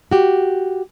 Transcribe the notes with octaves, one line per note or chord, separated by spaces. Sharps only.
F#4 G4